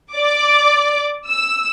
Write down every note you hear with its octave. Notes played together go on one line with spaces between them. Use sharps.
D5 D6
E6